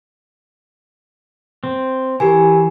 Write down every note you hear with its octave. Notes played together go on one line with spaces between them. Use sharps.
C4
E3 G4 A#4 G#5